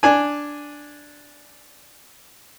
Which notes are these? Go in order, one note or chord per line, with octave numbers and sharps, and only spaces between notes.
D4 G#5